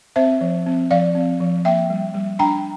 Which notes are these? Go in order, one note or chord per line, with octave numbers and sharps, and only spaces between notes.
C4 C5 E5
F3
C4
F3 D5 F5
C4
F3
A#3 E5 G5
G3
G3
D4 G5 A#5